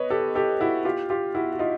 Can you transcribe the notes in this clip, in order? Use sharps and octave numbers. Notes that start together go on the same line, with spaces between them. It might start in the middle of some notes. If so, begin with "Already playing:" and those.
Already playing: B4 C#5 D#5
G4 A4
G4 A4
E4 F#4
F4 G4
F4 G4
E4 F#4
F#4
D#4 F4